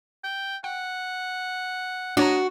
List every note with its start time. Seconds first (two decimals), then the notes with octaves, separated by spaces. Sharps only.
0.24 G5
0.64 F#5 G5
2.17 D4 F#4 C#5 D#5 A#5